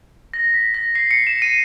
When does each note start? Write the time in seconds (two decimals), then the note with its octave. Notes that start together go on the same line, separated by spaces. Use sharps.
0.34 A#6
0.54 B6
0.74 A#6
0.95 C7
1.11 C#7
1.27 E7
1.42 D#7